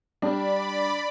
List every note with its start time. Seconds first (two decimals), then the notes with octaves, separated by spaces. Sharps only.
0.22 G3 D4 D5 B5